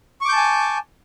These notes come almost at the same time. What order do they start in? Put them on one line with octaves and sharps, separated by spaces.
C#6 D6 G6 A5 G#5